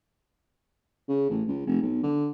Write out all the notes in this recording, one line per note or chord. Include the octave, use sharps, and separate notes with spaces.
C#3
A1
C#2
F1
B1
D3